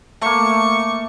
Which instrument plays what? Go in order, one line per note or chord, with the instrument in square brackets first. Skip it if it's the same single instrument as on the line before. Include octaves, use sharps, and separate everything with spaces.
[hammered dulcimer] A3 A#3 [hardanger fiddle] C#6